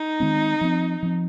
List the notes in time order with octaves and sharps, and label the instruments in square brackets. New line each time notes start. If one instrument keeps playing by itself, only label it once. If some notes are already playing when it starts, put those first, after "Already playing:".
Already playing: [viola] D#4
[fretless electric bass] D#3 G#3 C4
F3 C4
F3 C4